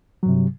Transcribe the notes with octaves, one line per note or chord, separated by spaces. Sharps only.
G2 C3 F#3